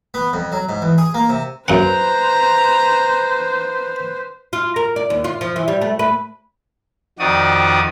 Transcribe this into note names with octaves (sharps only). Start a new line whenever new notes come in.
B3
F2
F#3
G#2
E2
G#4
A#3
C3
F#2 B4 C5 F#5 A#5
F4
A#4
D5
D#2
F4
F3
E3
G3
A3
B4
F2 D#3 F3 F#4 D5 D#6